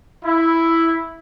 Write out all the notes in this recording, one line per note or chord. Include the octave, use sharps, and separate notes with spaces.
E4